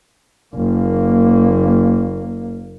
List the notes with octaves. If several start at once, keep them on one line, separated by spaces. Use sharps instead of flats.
F#1 A#3